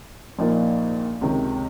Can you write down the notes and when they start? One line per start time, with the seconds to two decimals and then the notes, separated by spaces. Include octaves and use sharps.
0.39 A#1 A#2 F3 A#3 D#4
1.21 C#2 C3 D#3